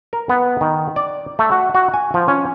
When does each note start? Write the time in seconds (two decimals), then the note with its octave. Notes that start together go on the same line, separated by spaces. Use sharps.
0.13 A#4
0.29 B3
0.61 D#3
0.96 D5
1.39 A3
1.52 F#4
1.75 F#4
1.94 G#5
2.14 F3
2.28 C#4